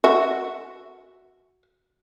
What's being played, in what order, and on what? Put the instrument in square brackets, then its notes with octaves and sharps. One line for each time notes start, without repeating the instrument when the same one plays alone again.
[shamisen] F#4 E5